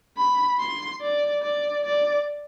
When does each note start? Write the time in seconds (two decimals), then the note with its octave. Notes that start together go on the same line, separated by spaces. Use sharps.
0.18 B5
0.60 C6
1.01 D5
1.43 D5
1.84 D5